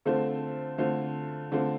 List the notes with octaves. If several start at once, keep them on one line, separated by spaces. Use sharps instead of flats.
D3 A3 C4 F4 C5
D3 A3 C4 F4 C5
D3 A3 C4 F4 C5